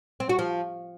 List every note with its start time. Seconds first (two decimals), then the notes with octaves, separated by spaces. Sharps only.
0.20 C4
0.29 F#4
0.39 F3